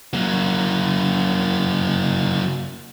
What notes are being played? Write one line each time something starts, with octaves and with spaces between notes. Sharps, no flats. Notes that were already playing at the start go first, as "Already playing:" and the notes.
F#3 A#3